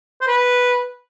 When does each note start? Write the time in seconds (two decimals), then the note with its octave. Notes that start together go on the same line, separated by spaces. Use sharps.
0.21 C5
0.28 B4